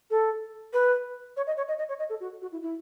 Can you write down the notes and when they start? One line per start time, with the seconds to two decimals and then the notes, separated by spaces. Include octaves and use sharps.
0.10 A4
0.73 B4
1.36 C#5
1.47 D#5
1.57 C#5
1.68 D#5
1.78 D#5
1.88 C#5
1.99 D#5
2.09 A4
2.20 F#4
2.41 F#4
2.52 E4
2.62 E4